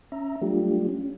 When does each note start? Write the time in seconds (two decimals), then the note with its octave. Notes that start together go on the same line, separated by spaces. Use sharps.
0.12 C#4 E5 A#5
0.42 F#3 G3 A3 D4 F4 G4
0.89 C#4